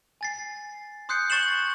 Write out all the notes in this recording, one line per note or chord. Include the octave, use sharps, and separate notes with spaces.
G#5 A6 C7
C6 D#6 F#6 G6 C7 C#7
C6 C#6 A6 C7 E7 F#7